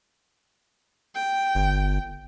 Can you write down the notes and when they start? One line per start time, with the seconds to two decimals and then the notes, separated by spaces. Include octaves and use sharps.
1.15 G5
1.55 G1